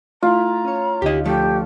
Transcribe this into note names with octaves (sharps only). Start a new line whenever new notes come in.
A3 E4 F4 A#5
C#4 C#5
D2 D3 D#4 G4 D#5
F3 A3 G4 A4